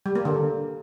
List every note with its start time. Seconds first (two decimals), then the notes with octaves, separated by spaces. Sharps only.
0.06 G3
0.15 A#3
0.25 D3